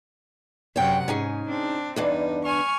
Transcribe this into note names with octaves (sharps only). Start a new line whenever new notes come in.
F#2 C3 C#5 F#5 G5
G#2 C#4 D#4 G#4
C4 D4
E2 G2 D4 D#4
G#5 C#6 F6